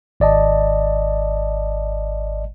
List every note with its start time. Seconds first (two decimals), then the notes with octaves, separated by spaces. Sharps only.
0.20 G#1 D5 D#5 A5